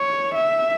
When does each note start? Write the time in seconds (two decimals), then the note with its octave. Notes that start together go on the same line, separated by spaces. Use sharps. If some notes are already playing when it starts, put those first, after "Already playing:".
Already playing: C#5
0.35 E5